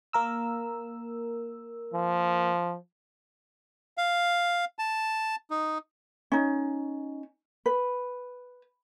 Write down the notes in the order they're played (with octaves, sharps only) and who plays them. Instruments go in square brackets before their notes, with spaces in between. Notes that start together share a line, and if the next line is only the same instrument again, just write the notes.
[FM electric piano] A#3 A#4 E6
[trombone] F3
[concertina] F5
A5
D#4
[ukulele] C#4 D#4
B4